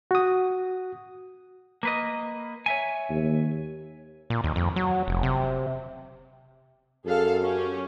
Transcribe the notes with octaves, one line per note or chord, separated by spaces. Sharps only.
F#4 D#6
A#3 B4 D#5
C#5 E5 G#5
D#2
A#2
D#2
F2
F#3
F1
C3
F#2 G#4 A4 F5
C#4 G4